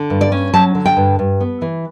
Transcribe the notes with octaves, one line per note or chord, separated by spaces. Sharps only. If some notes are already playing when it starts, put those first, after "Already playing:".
Already playing: D3
G2
D5
C#4
F#3 A5
D3
G5
G2
G2
B3
E3